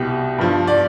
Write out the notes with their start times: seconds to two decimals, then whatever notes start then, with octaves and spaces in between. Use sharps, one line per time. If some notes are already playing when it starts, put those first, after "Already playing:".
Already playing: C2 B2 G4
0.38 G2 F3
0.67 D5